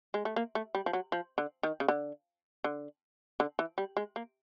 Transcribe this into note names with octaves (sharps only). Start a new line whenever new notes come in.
G#3
A3
A#3
A3
G3
F3
F#3
F3
D3
D#3
C#3
D3
D3
D3
E3
G3
G#3
A#3